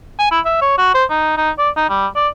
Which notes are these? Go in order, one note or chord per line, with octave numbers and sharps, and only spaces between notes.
G#5
E4
E5
C#5
F#4
C5
D#4
D#4
D5
D#4
G3
D5